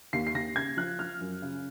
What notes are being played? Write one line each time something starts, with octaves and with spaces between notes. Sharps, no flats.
D#2 C7
C7
D#2 A#6
C#3 G#6
F3 F#6
F3 F6
F#2
C#3